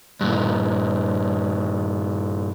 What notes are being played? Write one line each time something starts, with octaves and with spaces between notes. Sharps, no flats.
G2 A#2